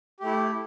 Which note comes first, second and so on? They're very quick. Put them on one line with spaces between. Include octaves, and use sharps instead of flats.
G4 A3 E4